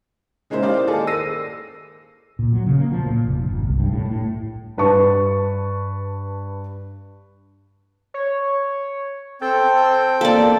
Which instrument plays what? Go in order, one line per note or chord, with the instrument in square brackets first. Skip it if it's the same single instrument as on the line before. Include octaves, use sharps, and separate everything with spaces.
[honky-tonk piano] C#3 G#3 A#3 D#4 E4 C5
G4 C5 D5 D#5 F5
D#3 A#3 G#4 A4 D5
E6 A#6 C7 D#7
[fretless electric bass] A#2
F#3
C#3
A#3
F3
A#2
F1
G1
C2
G2
A2
A2
[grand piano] G2 B4 A5 C#6
[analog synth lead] C#5
[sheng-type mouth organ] C4 G5 [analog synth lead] A4
[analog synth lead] A#3 [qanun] A4 D5